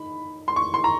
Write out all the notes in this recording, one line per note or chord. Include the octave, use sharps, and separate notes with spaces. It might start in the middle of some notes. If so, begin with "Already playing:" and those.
Already playing: D#3 B5
C6
C#6
C6
A#5